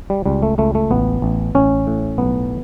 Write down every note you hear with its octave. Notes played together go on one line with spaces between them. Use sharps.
G3
C#2 G3
A3
C#2 A3
A3
A1 B3
A1
A1 C#4
A2
B1 B3